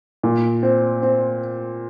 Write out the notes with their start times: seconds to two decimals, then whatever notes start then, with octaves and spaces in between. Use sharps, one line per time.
0.23 A#2
0.63 C4
1.02 C4